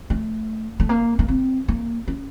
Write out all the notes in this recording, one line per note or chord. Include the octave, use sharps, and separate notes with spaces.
A3
A3
A#3
A#3
C4
A#3
C#4